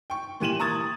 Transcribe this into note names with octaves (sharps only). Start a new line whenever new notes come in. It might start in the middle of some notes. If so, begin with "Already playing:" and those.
G5 C#6
A#2 E3 G4 D#7 E7 F#7
A#5 C#6 D#6 G#6 A6